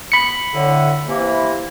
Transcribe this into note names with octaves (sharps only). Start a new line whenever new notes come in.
B5 C#7
A2 D3
C3 E3 A#3